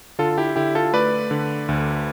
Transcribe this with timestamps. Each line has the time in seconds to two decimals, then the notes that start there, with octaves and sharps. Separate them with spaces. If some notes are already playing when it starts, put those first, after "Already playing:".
0.19 D3 F4 A4
0.38 E4 G4
0.56 D3 E4 G4
0.75 F4 A4
0.93 A3 B4 D5
1.31 D3
1.69 D2